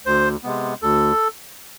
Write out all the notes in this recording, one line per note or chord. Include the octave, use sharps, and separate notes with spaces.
D2 C5
C3 G#3 B3
D2 A4